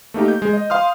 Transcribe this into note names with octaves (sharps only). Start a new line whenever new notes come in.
A3 A#3 D#4 G4
G6
G#3
D#5
F5 C6 D#6 F6